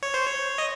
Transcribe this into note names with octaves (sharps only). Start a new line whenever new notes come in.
C#5
C5
C#5
D#5